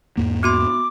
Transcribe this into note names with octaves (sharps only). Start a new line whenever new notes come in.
E2 G#2 A#3
B3 F#4 C6 D6